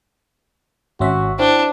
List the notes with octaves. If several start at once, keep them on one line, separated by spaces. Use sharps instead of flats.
G#1 C#4 F#4 E5 C6 B6
D4 E4 C5 G5 G7